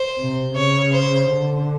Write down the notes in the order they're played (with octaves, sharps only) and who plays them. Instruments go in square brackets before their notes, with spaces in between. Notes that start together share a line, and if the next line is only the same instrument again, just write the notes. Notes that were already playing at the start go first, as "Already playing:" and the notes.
Already playing: [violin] C5
[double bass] C3
[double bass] C#3 [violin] C#5
[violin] C5
[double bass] D3